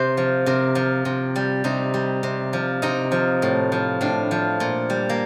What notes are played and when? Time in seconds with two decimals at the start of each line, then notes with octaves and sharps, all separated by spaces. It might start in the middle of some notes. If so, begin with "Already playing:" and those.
Already playing: C3 C5
0.17 F3
0.46 C3 A#4
0.75 F3
1.05 C3
1.36 G3
1.64 C3 D#4
1.94 G3
2.23 C3
2.53 F3
2.82 C3 D#4
3.12 F3
3.42 A2
3.72 F3
4.01 A2 D4
4.31 F3
4.60 A#2
4.90 G3
5.09 A#3